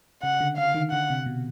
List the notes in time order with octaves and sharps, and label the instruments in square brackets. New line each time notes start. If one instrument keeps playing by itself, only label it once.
[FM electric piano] C#3 [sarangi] F#5
[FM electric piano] D3
[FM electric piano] D3 [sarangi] F5
[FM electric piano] D#3
[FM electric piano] D3 [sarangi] F#5
[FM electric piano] C3
B2